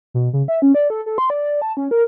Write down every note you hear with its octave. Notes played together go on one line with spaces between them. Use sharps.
B2
C#3
E5
C#4
D5
A4
A4
C6
D5
A5
C#4
A#4